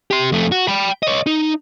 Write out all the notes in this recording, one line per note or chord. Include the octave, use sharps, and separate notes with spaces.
G4 C6
F2 A3
F#4
G5 B5
C#5 D#5
D#4